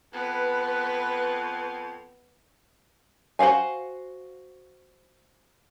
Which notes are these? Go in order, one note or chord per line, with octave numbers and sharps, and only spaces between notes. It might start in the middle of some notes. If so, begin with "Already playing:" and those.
F2 B3 B4
F#4 C5 D5 F5 G#5